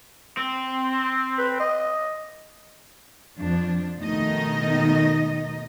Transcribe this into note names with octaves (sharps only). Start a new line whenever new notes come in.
C4
B4
D#5
F2 F3 D4
D#2 B2 D#3 A3 D#4 D#5